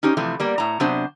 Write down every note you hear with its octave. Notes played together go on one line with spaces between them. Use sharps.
C#4 D#4 G4 C5
C3 E3 F3 A3
G3 A#3 B3
A2 A#5
C3 F#3 B3 D4 C5